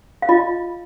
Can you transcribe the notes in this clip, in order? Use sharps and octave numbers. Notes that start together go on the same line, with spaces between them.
F5
F4 D#5